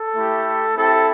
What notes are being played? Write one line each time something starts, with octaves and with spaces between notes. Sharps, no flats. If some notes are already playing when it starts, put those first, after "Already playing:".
Already playing: A4
A3 E4 G4
C4 E4 G4 A4